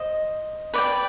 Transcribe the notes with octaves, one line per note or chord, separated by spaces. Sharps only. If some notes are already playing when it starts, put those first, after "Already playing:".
Already playing: C5 D#5
B4 D5 G5